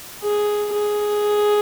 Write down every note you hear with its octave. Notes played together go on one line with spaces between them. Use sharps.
G#4
G#4